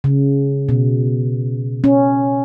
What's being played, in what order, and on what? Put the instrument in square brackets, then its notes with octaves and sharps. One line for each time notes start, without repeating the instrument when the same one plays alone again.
[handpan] C#3
B2
C#4